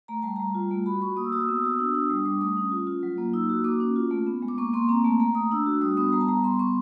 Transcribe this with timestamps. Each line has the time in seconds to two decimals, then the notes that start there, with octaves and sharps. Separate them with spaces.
0.08 A3 A#5
0.22 G3 A5
0.36 G3 A#5
0.55 F4
0.71 A3
0.86 F#4 B5
1.01 F#4 C#6
1.16 A#3 D#6
1.25 E6
1.32 F#4 D#6
1.41 E6
1.48 B3 D#6
1.56 E6
1.63 F#4 D#6
1.74 D#6
1.79 D4 E6
1.94 D4 D#6
2.10 G3 D#6
2.25 G3 D6
2.41 A3 D#6
2.57 C#4
2.72 F4
2.87 F4
3.03 F#3
3.18 A#3
3.33 D#4 E6
3.50 F#4
3.64 A#3 D6
3.80 C#4
3.96 F4
4.11 A3
4.26 B3
4.42 G#3
4.48 D6
4.58 A#3 C#6
4.73 A#3 C6
4.89 C4 A#5
5.05 A3 A5
5.20 A3 A#5
5.35 A3 D#6
5.51 D4 E6
5.66 F#4
5.81 G3 D#6
5.97 B3 D#6
6.12 G3 A#5
6.21 A5
6.28 G3 A#5
6.44 B3 C6
6.59 B3 C#6